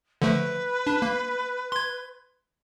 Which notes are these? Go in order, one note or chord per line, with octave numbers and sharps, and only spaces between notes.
D3 F3 A3 B4
D4
A#3
C6 G#6